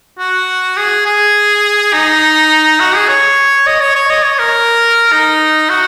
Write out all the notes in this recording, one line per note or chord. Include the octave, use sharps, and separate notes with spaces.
F#4
G#4
G#4
D#4
F#4
G#4
C#5
D#5
C#5
C#5
D#5
C#5
A#4
D#4
F#4